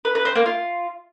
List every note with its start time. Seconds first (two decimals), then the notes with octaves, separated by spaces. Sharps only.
0.05 B4
0.15 B4
0.25 C5
0.35 A#3
0.46 F4